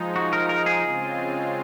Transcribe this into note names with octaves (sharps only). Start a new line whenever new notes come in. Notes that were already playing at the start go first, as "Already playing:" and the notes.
Already playing: F3 G#3 D#4
F#4
A#4
A#4
G#4
C#3 G#3 C4 F4